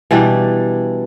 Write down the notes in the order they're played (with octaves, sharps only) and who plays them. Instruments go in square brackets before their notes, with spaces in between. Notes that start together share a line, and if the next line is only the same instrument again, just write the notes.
[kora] B2 E3 G3 D4